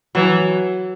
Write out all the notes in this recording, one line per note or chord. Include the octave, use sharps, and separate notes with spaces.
E3 F#3